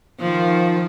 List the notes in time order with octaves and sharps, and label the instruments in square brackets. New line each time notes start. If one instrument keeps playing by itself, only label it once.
[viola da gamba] D#3 F3